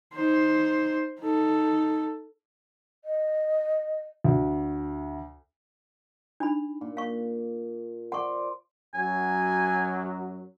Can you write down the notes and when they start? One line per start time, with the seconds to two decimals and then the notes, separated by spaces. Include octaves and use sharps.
0.15 D#4 C5
1.20 D#4 A4
3.04 D#5
4.24 D2
6.40 D4 D#4 B5
6.81 A#2
6.97 F5 C#6
8.12 C5 D5 F#5 C6 C#6
8.94 F#2 F#3 G#5